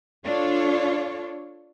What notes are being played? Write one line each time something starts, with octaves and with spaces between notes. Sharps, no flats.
D4 F4 A4 C#5